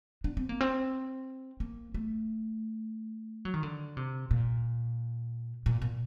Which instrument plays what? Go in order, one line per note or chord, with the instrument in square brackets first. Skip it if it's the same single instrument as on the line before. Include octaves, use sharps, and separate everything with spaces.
[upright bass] D4
C4
A#3
C4
A#3
A3
F#3
D#3
D3
C3
A#2
A#2
A#2